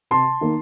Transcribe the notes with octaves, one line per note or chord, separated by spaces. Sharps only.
C3 A5 C6
D#3 A#3